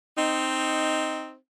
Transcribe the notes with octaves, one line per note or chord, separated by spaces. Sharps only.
C4 D#4